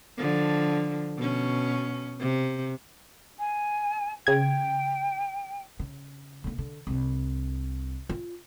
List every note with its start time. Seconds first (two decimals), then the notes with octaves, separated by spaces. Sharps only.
0.18 D3 F3
1.17 B2 C#4
2.20 C3
3.39 G#5
4.27 C#3 G5 G#6
5.79 C#3
6.44 D3 A#3
6.58 D3
6.87 C2 D4
8.09 F4